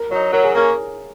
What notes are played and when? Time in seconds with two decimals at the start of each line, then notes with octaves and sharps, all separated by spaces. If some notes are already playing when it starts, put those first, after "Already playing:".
Already playing: A#4
0.11 F#3 D#4 C#5
0.33 F#3 A#4
0.44 G#4
0.55 A#3 C#4 A#4